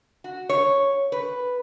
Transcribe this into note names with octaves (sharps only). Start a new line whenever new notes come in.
F#4
C#5
B4